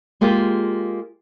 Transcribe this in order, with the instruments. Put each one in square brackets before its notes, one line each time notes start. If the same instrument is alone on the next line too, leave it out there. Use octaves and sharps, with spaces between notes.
[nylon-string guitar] G#3 A#3 F4 G4 G#4